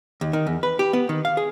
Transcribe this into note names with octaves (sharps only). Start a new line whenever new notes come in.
D#2
D#3
E2
B4
G4
B3
D#3
F5
G#4